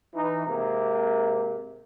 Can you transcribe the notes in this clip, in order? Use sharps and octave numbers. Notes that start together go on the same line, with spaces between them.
E3 D#4
G#2 C3 A#3